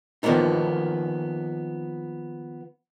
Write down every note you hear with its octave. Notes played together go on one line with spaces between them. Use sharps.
D#3 F3 F#3 A#3 B3 D#4